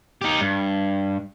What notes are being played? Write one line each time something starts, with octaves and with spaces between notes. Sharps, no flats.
D#4 G4
G2